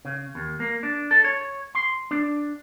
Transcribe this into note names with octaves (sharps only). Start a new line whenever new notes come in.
C#3
D#2
A#3
D4
A4
C#5
C6
D4